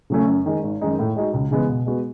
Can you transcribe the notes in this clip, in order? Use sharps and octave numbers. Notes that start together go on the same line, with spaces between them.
C#3 F#3 A3 C#4
F#2
D#3 G#3
G#1
F#2 D#3 G#3 D#4
A2
G#3 D#4 F#4
C#2
C#3 E3 G#3 B3
B2
G#3 B3 F#4